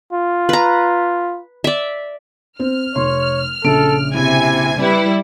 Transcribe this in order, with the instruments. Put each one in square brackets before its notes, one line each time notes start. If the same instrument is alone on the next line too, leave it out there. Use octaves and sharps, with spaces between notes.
[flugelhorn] F4
[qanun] B4 A#5
D5 E5
[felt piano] C4 [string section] F6
[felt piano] F1 C6 [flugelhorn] C#5
[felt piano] A#1 C#3 D7 [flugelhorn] A4
[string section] C3 G#5 G#6 [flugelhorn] E4
[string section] G3 E4 [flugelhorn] B4